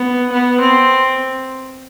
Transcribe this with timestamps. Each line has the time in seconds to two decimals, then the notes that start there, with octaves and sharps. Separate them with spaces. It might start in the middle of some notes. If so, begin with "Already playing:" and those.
Already playing: B3
0.32 B3
0.61 C4